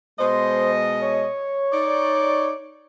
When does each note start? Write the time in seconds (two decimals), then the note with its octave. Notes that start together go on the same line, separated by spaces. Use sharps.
0.19 B2 G#3 C5 D#5
1.01 C#5
1.72 D#4 D5